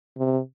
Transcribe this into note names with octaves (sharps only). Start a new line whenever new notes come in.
C3